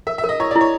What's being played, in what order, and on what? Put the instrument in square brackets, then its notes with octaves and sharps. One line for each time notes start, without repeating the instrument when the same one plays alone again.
[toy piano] A#4 [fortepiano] E5
[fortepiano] E5
[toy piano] A#4
[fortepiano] D#5
[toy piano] E4 [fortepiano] C#5
[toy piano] E4 [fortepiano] D5
[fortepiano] C#5